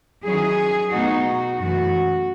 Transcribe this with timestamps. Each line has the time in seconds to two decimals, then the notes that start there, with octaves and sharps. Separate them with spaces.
0.24 D#3 F#3 C#4 E4 G#4
0.91 B2 A3 D#4 F#4
1.58 F#2 E3 A3 F#4